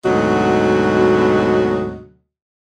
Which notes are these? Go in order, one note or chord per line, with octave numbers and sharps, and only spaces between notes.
D2 G#2 B2 F#3 F#4 D#5